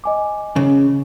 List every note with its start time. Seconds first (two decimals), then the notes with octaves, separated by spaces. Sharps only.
0.04 D#5 G#5 D6
0.56 C#3